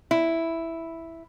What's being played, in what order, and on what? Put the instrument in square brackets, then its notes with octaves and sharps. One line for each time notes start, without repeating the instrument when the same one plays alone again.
[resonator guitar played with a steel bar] E4